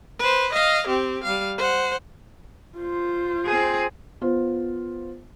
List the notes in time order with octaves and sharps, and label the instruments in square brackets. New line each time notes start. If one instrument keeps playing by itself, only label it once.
[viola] B4 C5
D#5 F5
C4 G4
G3 F5
C5 F#5
[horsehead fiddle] F4 C5
[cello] C4 G#4
[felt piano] B3 F4 C5